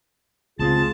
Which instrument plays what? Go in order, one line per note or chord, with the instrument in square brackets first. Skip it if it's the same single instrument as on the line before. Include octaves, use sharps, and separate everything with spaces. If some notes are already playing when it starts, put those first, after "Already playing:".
[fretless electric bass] C#2 C4 [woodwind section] F4 G#4 [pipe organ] A5